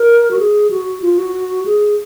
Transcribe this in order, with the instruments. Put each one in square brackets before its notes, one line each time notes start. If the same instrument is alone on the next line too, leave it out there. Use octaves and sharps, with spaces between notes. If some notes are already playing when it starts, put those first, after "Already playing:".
Already playing: [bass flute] A#4
F#4
G#4
F#4
F4
F#4
G#4